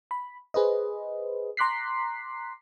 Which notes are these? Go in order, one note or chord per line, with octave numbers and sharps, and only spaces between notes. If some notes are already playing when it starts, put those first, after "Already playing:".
B5
G#4 B4 C5 D#5
A#5 C6 D6 F#6 B6 C7